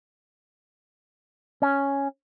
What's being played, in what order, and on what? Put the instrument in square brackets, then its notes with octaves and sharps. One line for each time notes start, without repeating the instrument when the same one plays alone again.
[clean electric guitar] C#4